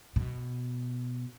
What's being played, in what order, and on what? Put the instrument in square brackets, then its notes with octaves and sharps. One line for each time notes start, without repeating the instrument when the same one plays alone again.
[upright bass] B2